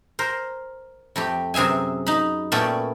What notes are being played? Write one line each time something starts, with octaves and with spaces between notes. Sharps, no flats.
A#4 C5
F2 A3 G4
F#2 C3 G#4 E5 G#5
D#4 B5
A#2 A3 B3 C#4 D5 G5